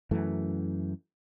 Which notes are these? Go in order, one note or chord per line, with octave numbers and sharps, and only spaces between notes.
F#2 E3 A3